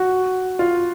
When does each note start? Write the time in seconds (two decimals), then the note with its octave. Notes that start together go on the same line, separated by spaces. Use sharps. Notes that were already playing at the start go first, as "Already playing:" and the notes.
Already playing: F#4
0.59 F4